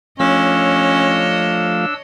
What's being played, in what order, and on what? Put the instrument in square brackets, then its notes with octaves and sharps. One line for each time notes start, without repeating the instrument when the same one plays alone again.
[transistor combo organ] F3 A3 F5 [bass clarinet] C#4 [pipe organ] D4 E6 [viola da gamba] C#5 D#5